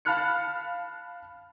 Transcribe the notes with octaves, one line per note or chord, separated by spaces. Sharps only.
F5 A5 B5 F6 F#6 C#7